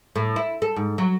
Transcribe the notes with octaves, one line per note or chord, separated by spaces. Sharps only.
A2
E4
A4
G#2
F#3